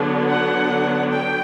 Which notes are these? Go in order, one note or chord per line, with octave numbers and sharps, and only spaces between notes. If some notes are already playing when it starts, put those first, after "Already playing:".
Already playing: D3 F#3 B3 D4
F#5
G5